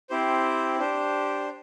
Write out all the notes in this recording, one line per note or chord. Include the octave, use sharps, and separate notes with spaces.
C4 E4 G4 C5
D4 G4 C5